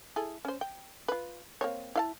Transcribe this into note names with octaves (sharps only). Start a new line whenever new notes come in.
E4 G#4 A4
C#4 C5
G5
F4 B4
A#3 C4 C#5
E4 F5 A5